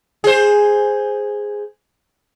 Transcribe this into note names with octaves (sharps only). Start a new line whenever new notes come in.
G#4 C5